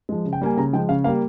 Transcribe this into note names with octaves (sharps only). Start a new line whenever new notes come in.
F3 G#3
C#3
G5
G3 A#3 G#5
C#3 A#5
F3 G#3 G5
C#3 F5
G3 A#3 F5